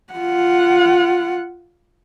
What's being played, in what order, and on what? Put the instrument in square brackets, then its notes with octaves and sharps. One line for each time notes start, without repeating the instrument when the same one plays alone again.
[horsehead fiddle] F4 F#5